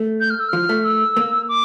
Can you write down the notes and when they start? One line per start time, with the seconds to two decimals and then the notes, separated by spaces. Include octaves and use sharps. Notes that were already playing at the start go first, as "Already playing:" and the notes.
Already playing: A3
0.20 G6
0.30 F6
0.40 E6
0.49 F3 F6
0.69 A3
0.84 E6
1.17 A#3
1.49 D6